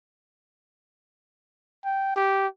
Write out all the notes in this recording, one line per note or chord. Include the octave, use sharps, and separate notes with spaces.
G5
G4